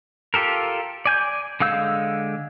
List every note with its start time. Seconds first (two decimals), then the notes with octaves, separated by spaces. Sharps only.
0.34 F4 G4 A4 A#4
1.05 D5 G#5 G6
1.60 D3 G#3 F5 E6 G6